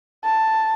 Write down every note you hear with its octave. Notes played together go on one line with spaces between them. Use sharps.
A5